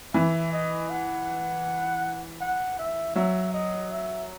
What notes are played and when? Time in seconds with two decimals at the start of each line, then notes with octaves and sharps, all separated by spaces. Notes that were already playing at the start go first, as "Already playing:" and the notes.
0.14 E3 E5
0.52 D#5
0.90 F#5
2.41 F#5
2.79 E5
3.15 F#3 E5
3.54 D#5
3.91 E5